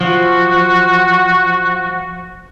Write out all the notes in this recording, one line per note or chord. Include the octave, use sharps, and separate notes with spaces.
F3 F#4